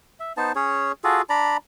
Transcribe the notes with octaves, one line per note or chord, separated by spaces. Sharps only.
E5
B3 D#4 C5 A5
C#4 G#4 C#5
F4 F#4 G#4 A4
D4 D5 A#5 B5